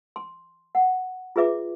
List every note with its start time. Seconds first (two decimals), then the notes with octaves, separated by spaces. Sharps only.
0.16 C6
0.75 F#5
1.36 F4 G#4 B4 E5 D6